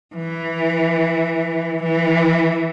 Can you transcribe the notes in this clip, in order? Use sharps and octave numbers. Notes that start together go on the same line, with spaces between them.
E3
E3